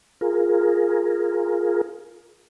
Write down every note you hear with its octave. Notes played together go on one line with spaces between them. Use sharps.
F4 G#4 A#4